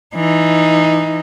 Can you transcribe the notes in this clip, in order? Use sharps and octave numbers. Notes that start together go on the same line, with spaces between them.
E3 D#4